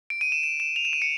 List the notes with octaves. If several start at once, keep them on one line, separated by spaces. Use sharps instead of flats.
D7
D#7
E7
E7
E7
F7
E7
D#7
C#7